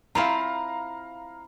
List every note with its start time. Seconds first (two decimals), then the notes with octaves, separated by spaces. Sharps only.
0.15 C4 E4 F4 F5 A#5